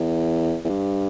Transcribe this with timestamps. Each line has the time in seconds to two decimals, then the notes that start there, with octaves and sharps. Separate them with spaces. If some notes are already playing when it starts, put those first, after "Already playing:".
Already playing: E2
0.65 E2
0.69 G2